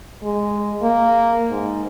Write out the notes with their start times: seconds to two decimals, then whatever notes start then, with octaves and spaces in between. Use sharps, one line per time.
0.23 G#3
0.82 A#3
1.50 G#2